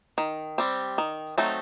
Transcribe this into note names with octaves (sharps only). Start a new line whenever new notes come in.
D#3
G3 C4
D#3
F#3 A3 C4 D#4